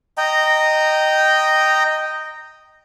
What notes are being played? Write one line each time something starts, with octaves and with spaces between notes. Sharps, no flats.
D#5 G5 A#5